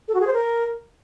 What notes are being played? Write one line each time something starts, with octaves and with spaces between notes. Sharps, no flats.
A4
F#4
G#4
C5
A#4